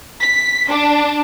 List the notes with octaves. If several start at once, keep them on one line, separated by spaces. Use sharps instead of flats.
B6
D4